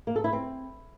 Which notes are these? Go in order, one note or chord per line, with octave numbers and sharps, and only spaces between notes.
A#3
A4
E4
C4